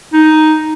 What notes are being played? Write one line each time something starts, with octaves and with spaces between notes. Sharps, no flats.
D#4